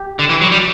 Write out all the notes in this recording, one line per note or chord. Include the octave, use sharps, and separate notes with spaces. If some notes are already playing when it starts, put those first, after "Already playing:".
Already playing: G4
D3
E3
F#3
G3